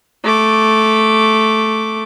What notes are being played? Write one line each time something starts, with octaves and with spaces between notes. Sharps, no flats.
A3 D6